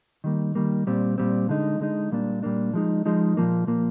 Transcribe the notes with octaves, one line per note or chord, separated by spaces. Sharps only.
D#3 G3 A#3
D#3 G3 A#3
A#2 G3 C4
A#2 G3 C4
D3 G#3 D#4
D3 G#3 D#4
A#2 G3 A#3 D4
A#2 G3 A#3 D4
F3 G#3 D#4
F3 G#3 D#4
A#2 F3 A#3
A#2 F3 A#3